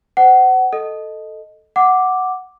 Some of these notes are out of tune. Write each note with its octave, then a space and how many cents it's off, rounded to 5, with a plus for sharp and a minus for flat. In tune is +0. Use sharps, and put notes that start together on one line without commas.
C5 -25 F#5 +25
A4 +0 D#5 +0
F#5 +0 D6 +0